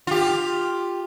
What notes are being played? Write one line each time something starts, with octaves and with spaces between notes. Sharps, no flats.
F4 G4